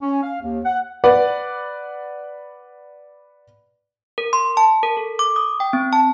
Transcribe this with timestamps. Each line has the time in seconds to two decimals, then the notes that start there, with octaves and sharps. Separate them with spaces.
0.01 C#4
0.23 F5
0.42 D#2
0.64 F#5
1.04 B4 D5 F#5
4.18 A#4
4.33 C6
4.57 A5
4.83 A#4
4.97 A4
5.19 D6
5.36 D#6
5.60 G5
5.73 C4
5.93 A5